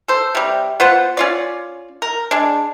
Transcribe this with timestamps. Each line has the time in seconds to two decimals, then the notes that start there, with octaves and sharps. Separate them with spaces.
0.08 A4 C5
0.35 C3 G3
0.80 B3 F4 C5 F#5
1.17 C#4 F4 D5
2.02 A#4
2.31 G#3 D4